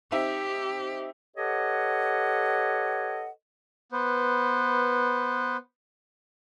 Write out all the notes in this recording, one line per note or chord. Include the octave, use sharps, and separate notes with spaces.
C4 D#4 G4 E5
G4 A4 B4 C#5 D#5 F#5
B3 B4 C5